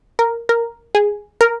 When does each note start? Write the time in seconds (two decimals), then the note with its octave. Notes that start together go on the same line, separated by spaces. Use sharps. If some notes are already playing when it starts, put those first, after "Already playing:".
0.19 A#4
0.49 A#4
0.95 G#4
1.41 A#4